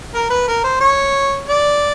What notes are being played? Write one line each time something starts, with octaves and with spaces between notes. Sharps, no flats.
A#4
B4
A#4
C5
C#5
D5